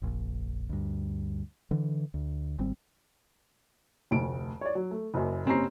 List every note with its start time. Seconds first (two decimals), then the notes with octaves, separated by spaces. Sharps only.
0.02 F1 A#1
0.69 D2 G2
1.71 D3 E3
2.14 D2
2.59 G#1 G3 C4
4.11 F1 D2 D7
4.61 C#5 D5
4.75 F#3
4.91 A3
5.14 F#1 F#2
5.46 F#1 C4 C#4 G4 A#5 C7